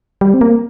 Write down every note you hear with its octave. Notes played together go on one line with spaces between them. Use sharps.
G3
C4
A#3